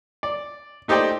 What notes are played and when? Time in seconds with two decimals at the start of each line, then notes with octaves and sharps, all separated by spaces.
0.23 D5
0.88 A3 D#4 G4 C5 D5 G5